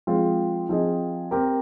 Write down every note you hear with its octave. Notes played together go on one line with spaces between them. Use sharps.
F3 G#3 C4 F4
F3 C4 F4 G#4 D#5
C4 G4 A#4